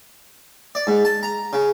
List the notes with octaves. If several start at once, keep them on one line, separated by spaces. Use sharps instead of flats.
D5
G#2
A5
A#5
C#3